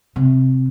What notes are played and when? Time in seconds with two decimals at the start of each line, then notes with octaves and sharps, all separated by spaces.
0.16 C3